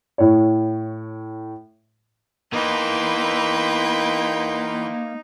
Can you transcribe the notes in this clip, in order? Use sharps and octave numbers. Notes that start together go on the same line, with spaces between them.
A2 C#5
E3 A#3 B3 D#4 B4 G5 C6